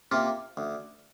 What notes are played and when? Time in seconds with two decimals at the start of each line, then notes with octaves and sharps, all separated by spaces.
0.11 C3 A#3 F4
0.57 D2